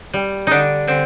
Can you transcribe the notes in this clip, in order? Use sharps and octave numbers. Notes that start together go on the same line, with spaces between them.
G3
D3 D4 D#4
D3 C4